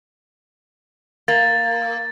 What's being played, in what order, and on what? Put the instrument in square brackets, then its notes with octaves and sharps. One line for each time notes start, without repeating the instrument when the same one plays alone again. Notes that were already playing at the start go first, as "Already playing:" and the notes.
[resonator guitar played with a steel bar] A#3 [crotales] A6